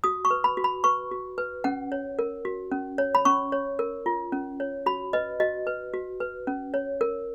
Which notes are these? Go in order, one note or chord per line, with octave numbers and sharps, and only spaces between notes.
F#4 D#6
C#6
B4
B5
F#4
B5
B4 C#6
F#4
B4
C#4 F#5
C#5
A#4
F#4
C#4
C#5
B5
C#4 C#6
C#5
A#4
F4
C#4
C#5
F#4 B5
B4 D#5
F#4 D#5
B4
F#4
B4
C#4
C#5
A#4